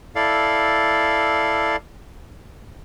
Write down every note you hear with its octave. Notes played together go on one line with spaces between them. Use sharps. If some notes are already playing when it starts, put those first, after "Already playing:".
E4 A4 D5 F5